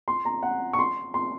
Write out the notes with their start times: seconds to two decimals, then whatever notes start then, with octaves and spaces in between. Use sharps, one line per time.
0.08 C6
0.25 A#5
0.43 F#5
0.73 C#6
0.79 C6
1.14 C6